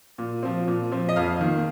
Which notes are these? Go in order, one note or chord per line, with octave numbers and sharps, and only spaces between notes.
A#2
F3 C4
A#2
F3 C4
D#5
F2 F5
D#3 A#3